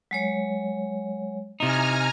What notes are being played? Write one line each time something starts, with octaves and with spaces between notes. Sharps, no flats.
F#3 G#3 C#5
C3 D#4 E4 E5 G#5 A#5 D#6 F6